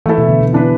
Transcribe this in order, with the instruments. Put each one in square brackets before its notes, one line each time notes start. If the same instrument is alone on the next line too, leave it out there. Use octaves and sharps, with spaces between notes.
[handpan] E3 [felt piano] A3 E4 A4
[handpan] B2
D3
B2
[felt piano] E3 D4 B4